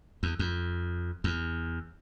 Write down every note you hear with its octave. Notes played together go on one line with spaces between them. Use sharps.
E2
F2
E2